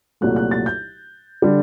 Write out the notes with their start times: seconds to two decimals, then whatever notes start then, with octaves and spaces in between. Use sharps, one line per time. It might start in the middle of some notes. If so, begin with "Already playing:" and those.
0.21 C2 A#2 F#3 A3 F#6
0.36 F#6
0.51 A6
0.66 G6
1.42 D3 G3 D4